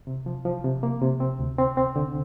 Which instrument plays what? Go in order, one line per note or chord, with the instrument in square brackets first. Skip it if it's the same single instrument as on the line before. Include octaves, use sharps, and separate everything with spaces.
[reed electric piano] C3
F3
F3
C3
A#3
C3
C4
D2
C4
C4
D3